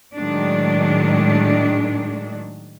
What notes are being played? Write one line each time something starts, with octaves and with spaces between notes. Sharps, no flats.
A2 D#3 F#3 G#3 D4